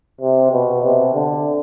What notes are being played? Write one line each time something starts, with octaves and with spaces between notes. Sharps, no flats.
C3
B2
C3
D3